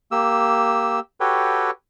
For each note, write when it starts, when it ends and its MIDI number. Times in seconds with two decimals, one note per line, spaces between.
0.11 1.00 58
0.11 1.00 67
0.11 1.00 88
1.20 1.71 66
1.20 1.71 67
1.20 1.71 69
1.20 1.71 71
1.20 1.71 73
1.20 1.71 79